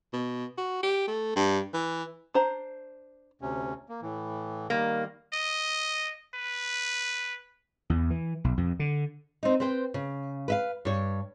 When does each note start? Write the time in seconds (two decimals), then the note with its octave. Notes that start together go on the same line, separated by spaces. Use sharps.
0.13 B2
0.58 F#4
0.83 G4
1.07 A3
1.36 G2
1.74 E3
2.34 D4 C5 A#5
3.41 D2 C3 C#4
3.89 A#3
4.02 A2 E3
4.70 D#3 G3 A#3
5.33 D#5
6.35 B4
7.90 E2
8.10 E3
8.44 B1
8.57 F2
8.79 D3
9.43 C4 D#4
9.60 C4 B4 C5 G5
9.94 C#3
10.48 B4 E5 F5
10.85 G2 C#5